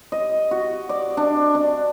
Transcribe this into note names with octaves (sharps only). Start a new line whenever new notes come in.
D#5
F#4
D5
D4
D4